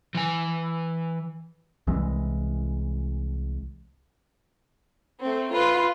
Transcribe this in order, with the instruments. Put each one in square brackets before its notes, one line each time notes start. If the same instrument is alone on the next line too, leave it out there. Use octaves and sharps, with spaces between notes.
[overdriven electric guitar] E3 G#5
[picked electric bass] C2 E3 G#3
[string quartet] A3 C4
F4 B4